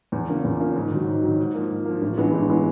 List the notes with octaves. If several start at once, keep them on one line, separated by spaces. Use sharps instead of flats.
E2
C#3 F3 A#3
E2
C#3 F3 A#3
G#2
D#3 F#3
G#2
D#3 F#3
G#2
F3 A#3
G#2
F3 A#3
A1
G2 E3 G#3 B3
A1
E3 G#3 B3